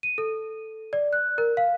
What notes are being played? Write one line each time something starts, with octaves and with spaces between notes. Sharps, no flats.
D#7
A4
D5
F#6
A#4
F5